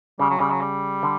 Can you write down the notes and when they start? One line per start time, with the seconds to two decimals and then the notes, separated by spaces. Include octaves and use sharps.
0.19 C#3 G3
0.30 F#3
0.40 C#3 G3
0.51 F#3
0.61 G3
1.03 D3